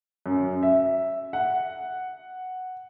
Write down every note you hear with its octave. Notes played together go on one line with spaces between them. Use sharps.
F#2
E5
F#5